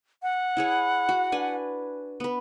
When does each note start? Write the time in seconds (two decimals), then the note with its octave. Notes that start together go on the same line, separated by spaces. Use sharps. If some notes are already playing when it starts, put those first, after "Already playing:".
0.23 F#5
0.57 E4 G#4 C#5
1.09 F#4
1.32 D4 B4 G#5
2.20 B3 B4